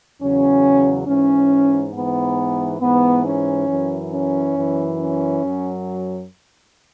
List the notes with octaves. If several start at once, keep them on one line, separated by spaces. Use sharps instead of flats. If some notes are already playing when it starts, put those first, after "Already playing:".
E2 C#3 F#3 C#4
G#2 E3 C#4
G#2 E3 B3
G#2 E3 B3
C#4
F#2 E3
C#4
F#2 E3
C#4
F#2 F#3